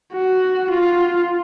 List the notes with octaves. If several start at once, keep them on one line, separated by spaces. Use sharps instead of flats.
F#4
F4